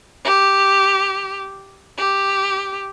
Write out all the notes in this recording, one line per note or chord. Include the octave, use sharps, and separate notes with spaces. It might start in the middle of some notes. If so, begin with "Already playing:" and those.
G4
G4